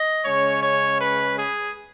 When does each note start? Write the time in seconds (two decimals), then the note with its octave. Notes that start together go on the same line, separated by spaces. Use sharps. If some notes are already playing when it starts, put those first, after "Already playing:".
Already playing: D#5
0.25 C#3 G#3 C#4 C#5
0.63 C#5
1.00 B4
1.39 G#4